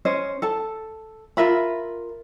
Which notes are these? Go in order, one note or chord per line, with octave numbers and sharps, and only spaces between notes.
C#4 C5 D#5
A4 A5
F4 A#4 E5 B5